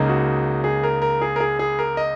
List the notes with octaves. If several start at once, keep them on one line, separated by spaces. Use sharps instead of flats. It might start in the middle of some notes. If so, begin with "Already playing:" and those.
Already playing: C#2 C#3 A#3 D#4
F#4
G#4
A#4
A#4
G#4
A#4
G#4
G#4
A#4
D#5